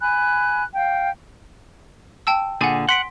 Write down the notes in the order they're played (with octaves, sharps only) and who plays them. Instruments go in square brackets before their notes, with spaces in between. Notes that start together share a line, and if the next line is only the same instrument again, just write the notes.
[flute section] G#5 B5 F#6
F5 G5
[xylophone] G5 A5 E6
[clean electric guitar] A#2 D3 G#4 [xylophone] F#5 G#5
[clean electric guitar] F#5 [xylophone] C6 B6 D7